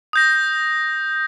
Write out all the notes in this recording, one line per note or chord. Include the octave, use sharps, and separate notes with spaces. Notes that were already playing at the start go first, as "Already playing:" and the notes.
D#6 G6 A#6